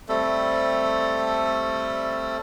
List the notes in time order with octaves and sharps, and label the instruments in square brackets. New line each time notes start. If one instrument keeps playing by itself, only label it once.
[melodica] G3 A3 C4 A4